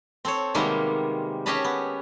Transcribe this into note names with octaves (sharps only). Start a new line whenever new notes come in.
C4 A4 C5 C#5
C3 D#3 G3 G#3 A#3 B3
C#4 G4 G#4 D#5 A5 B5
B3